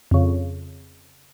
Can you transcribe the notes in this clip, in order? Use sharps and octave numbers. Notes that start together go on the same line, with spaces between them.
F2 C#3